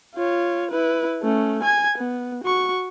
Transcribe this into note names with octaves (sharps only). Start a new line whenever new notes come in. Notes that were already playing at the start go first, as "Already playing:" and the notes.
F4 C#5
E4 B4
A3 C#4
G#5 G#6
B3
F#4 C#6